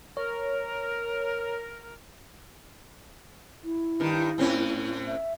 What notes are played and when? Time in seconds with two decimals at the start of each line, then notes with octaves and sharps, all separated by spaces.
0.17 A#4 C#5
3.64 E4
4.00 G2 D#3
4.38 A2 C4 C#4
5.07 E5